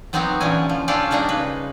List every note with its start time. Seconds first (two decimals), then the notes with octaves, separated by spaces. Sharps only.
0.13 F#3 B3 C4 D#4 F#4 G4
0.40 A#2 D3 E3 C#4 G#5
0.69 F3
0.88 C#4 D4 F4 G4 A4 D5
1.11 G3 G#3 A#3 D4 D#4
1.29 C#3 B4